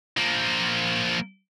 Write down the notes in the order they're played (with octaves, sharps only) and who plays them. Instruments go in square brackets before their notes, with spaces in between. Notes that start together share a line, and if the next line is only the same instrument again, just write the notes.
[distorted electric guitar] F3 A#3